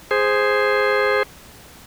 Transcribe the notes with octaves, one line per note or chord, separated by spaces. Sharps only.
G#4 C5